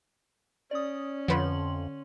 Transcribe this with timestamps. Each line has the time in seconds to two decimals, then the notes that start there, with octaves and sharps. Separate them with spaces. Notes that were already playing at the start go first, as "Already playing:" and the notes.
0.71 C#4 D5 D#6
1.28 F2 D3 F3 B4 C#5 C6 F#7